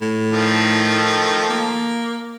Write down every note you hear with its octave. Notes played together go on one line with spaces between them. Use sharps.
A2
D#3 F3 A3
A#3